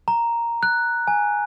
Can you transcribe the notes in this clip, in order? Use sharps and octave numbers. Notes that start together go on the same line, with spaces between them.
A#5
F#6
G#5